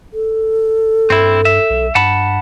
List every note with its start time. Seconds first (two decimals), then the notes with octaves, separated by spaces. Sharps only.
0.13 A4
1.10 G2 C4 E4
1.45 E5
1.70 B1
1.95 G2 F#5 A5 B5